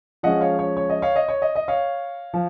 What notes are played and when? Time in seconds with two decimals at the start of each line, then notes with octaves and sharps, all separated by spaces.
0.23 F3 G#3 C#4 D#5 F#5
0.41 C#5 F5
0.59 C#5
0.77 C#5
0.90 D#5
1.02 C#5 F5
1.16 D#5
1.28 C#5
1.42 D#5
1.55 D#5
1.68 C#5 F5
2.34 F3